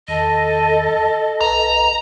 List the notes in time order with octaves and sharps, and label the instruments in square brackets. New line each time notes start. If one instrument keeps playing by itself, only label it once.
[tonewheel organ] E2 D#3 [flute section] A4 A5 [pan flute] D#5
[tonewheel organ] B1 B4 F5 [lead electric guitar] A#5